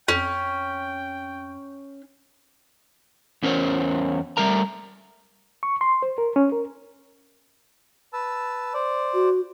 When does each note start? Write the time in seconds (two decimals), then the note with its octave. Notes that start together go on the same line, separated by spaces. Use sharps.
0.08 F2 C#4 G5
3.42 E2 C#4 A#4 C5 C#5
4.37 G3 A3 A#4 A#5
5.63 C#6
5.81 C6
6.02 C5
6.18 A#4
6.36 C#4
6.52 A#4
8.13 B4 A5 E6
8.74 C5 D5
9.14 F#4